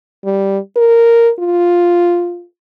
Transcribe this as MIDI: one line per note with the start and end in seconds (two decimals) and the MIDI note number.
0.25 0.58 55
0.76 1.31 70
1.39 2.44 65